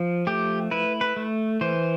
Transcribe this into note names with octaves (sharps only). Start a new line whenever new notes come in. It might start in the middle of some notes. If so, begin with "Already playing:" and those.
Already playing: F3
A3 G4
E4 B4
B4
A3
E3 C5